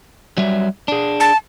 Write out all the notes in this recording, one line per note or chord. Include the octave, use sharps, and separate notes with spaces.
F#3 G3 E5
D4 G#4
A5